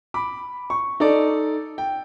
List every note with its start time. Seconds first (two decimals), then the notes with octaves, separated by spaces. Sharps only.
0.14 B5 D6
0.70 C#6
1.00 D#4 A4 D5
1.78 G5